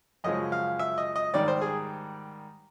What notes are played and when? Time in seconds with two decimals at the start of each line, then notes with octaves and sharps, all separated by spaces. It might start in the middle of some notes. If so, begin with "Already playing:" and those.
0.24 F#2 C#3 F3 G#3 D#5
0.52 F5
0.79 E5
0.98 D#5
1.16 D#5
1.34 G#2 D#3 G3 D5
1.48 C5
1.62 G#4